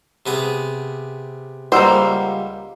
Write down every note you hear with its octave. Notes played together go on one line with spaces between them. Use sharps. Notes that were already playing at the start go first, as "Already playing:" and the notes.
C3 B3 G#4
C#2 G3 A#3 C5 F#5 E6